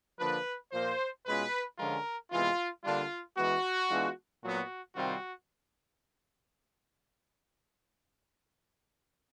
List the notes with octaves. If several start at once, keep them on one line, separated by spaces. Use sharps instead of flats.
D3 F3 A#3 D4 B4
A#2 F3 A#3 C5
B2 G#3 C#4 F4 B4
D3 F3 G#3 C#4 F4 A#4
C3 E3 G#3 B3 F4
D3 G3 A#3 D4 F4
E3 G#3 B3 F#4
E3 G#3 B3 D4 F4
A#2 F#3 B3 F#4
C3 D#3 G3 C4 F4 F#4